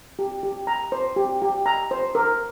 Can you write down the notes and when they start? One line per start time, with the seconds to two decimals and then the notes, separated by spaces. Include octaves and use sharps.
0.19 G4
0.43 G4
0.67 A#5
0.92 C5
1.16 G4
1.42 G4
1.66 A#5
1.91 C5
2.15 A#4